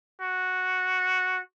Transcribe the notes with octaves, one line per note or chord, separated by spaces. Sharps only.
F#4